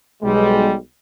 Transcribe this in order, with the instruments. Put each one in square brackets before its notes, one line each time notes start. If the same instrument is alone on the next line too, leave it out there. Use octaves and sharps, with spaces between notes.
[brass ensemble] B1 G3 G#3